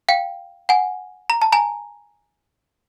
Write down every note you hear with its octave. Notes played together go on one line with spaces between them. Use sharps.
F5 G5
F#5 G#5
A#5
A5
G#5 A#5